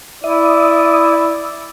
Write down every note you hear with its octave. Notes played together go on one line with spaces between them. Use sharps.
E4 D5 E5 D#6